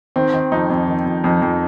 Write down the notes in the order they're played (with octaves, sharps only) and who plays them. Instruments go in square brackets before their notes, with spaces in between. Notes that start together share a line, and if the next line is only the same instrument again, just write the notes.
[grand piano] D#3 C4
D#3
F2 D#4
F2
D#3
F2
F2
F2